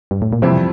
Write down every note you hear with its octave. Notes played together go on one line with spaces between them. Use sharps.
G2
A2
A#2
F2 C3 E3 G3 C4 E4